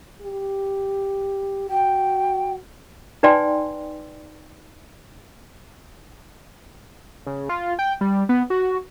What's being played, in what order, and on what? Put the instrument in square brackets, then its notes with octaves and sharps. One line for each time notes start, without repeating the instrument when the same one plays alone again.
[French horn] G4
[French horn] F#4 [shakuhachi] G5
[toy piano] D#4 B4 D5 G5 G#5 C6
[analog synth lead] C#3
F4
G5
G3
B3
F#4